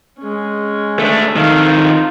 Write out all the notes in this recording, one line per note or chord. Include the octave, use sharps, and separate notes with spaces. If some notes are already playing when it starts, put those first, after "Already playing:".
G#3 C#4
A3 D4
F2 D#3 A4 F5
F4